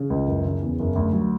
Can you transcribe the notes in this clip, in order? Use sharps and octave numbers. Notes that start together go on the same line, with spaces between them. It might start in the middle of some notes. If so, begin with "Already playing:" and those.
Already playing: C#3
C#2
F#1
C#3
E2
F#1
D2
F#3